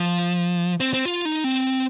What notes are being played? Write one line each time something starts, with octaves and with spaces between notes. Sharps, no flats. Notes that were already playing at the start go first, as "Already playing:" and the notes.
Already playing: F3
C4
C4
F4
D#4
C4